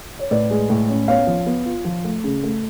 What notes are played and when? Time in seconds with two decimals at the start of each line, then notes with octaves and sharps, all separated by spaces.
0.19 C#5
0.31 A2 B4 D5
0.51 G#3
0.70 A2
0.89 C#4
1.08 B3 C#5 F5
1.27 F3
1.47 B3
1.66 F4
1.85 F3
2.05 A3
2.24 C#3
2.43 A3